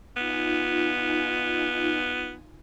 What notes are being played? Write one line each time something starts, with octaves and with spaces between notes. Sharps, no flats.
B3 D#4 F4 G#5